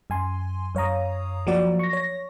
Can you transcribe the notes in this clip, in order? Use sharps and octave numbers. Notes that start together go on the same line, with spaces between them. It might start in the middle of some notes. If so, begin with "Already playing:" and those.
F#2 G#5 C6
F#2 C#5 F5 A#5 D#6
F3 F#3 A#3 F#4 A#4 D5
C#6 A#6
C#5 A#6